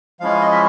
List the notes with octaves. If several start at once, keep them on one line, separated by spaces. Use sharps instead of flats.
F3 G#3 C#4 E4 F5
D#5
E5